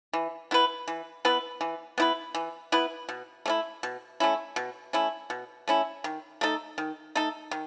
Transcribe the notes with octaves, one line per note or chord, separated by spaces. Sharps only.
E3
B3 E4 B4
E3
B3 E4 B4
E3
B3 E4 B4
E3
B3 E4 B4
B2
A3 C#4 E4
B2
A3 C#4 E4
B2
A3 C#4 E4
B2
A3 C#4 E4
D#3
A3 D#4 A4
D#3
A3 D#4 A4
D#3